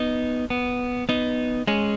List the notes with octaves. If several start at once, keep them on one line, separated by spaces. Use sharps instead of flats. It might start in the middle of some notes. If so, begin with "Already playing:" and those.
Already playing: B3 D#4
B3
B3 D#4
G#3 C#4